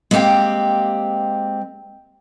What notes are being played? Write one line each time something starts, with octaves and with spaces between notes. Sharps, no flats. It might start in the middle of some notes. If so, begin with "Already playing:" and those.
G#3 A#3 C4 G4 F5 G5